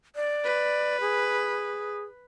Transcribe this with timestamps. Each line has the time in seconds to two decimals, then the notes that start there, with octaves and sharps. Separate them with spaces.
0.16 D5
0.45 B4
1.01 G#4